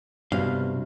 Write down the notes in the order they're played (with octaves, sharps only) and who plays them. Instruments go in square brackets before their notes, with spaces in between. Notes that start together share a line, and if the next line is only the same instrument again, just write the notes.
[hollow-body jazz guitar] C2 F5 [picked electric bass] G2 B2